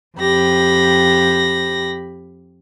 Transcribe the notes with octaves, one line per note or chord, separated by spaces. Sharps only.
F2 G4 B5 A#6